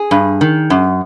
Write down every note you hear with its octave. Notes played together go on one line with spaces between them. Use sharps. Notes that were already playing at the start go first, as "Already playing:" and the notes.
Already playing: G#4
G2
D#3
F#2